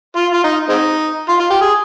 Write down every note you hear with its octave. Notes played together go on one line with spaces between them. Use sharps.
F4
F4
D#4
G#3 C4 D#4
F4
F4
G4
G#4